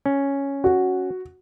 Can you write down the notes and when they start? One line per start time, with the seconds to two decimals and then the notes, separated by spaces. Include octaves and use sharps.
0.06 C#4
0.64 F#4